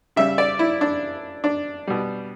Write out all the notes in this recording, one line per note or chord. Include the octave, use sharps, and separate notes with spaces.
C#3 G3 E5
D5
E4
D4
D4
B2 G3